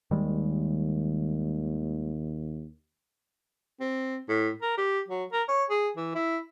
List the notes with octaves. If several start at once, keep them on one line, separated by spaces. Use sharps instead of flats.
D#2 D#3 G3 G#3
C4
A2
A#4
G4
F#3
A#4
C#5
G#4
E3
E4